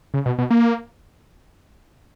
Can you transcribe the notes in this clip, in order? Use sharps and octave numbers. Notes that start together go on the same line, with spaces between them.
C#3
B2
B2
A#3